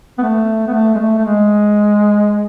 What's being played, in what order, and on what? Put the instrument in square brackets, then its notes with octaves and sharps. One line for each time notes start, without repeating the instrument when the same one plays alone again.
[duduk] B3
A3
B3
A3
G#3
A3
A3
G#3